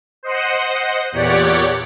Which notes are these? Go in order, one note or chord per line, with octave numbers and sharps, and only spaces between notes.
C5 D#5 F#5
E2 A#2 G4 C#5 D5 F#5